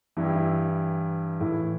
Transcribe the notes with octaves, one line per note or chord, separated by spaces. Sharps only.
G2 E3 E4
G4
E4
A2 E3 E4